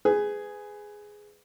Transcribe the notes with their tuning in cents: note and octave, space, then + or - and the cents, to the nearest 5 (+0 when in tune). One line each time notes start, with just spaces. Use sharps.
G#4 +0 B4 +25